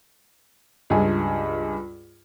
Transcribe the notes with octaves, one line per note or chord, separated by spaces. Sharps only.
C#2 G2 F4 G#4 G#5